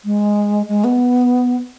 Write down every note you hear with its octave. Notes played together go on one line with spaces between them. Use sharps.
G#3
G#3
B3